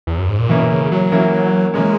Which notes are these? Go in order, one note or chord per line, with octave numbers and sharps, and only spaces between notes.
E2
F#2
G#2
A#2
B2 E3 A#3 C#4 E4
C#3
F#3
E3 A#3 C#4 E4
E3 G#3 A#3 C#4